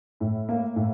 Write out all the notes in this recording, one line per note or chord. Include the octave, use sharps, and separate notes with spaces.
A2
A#3
A2